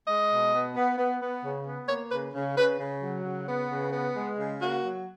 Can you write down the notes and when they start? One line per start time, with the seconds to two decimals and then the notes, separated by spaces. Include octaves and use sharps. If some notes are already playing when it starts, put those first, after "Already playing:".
0.07 G#3 D#5
0.30 B2
0.53 B3
0.76 B3
0.98 B3
1.21 B3
1.44 C#3
1.66 B3
1.88 A#3 C#5
2.12 C#3 B4
2.35 C#3
2.57 C#3 B4
2.80 C#3
3.03 F#3
3.25 C#3
3.48 B3
3.70 C#3
3.93 B3
4.16 G#3
4.39 C#3
4.62 A#3 F#4
4.83 F#3